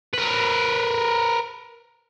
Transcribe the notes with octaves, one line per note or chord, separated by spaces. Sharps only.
A#4 B4